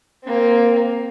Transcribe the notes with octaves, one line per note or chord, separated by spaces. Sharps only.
A#3 C4